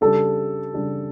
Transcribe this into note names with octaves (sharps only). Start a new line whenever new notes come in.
C#3 G3 D4 G4 A4
C#3 G3 D4 G4